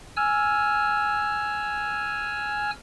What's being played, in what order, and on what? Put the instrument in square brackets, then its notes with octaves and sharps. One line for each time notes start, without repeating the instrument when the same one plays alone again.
[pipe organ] G#5 E6 F6